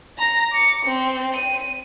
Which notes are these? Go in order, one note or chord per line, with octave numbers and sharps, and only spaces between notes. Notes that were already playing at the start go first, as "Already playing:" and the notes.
A#5 A#6
D6 C#7
C4
D#7